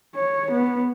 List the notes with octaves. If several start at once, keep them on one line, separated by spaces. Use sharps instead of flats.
C#5
B3